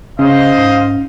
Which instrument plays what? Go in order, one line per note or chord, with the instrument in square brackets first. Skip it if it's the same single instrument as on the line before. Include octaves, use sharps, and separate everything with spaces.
[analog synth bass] C#3 [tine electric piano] C#4 [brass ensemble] C5 D#5 [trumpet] F5
[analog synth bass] G#2